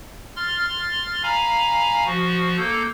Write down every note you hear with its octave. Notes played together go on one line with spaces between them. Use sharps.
C6 F6 A6
F5 G#5 A#5 B5
F3 F#4
A#3 A4 G6